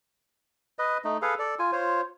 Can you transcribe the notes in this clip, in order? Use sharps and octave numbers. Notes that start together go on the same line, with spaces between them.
B4 D#5
A3 D#4
G#4 A4 B4 F5
A4 D5
F4 G#5
F4 C5 C#5